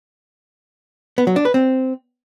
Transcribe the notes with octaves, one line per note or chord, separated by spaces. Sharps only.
B3
F#3
D4
B4
C4